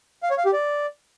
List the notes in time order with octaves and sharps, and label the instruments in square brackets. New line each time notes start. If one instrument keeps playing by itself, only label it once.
[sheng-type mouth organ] F5
C#5
F5
G4
D5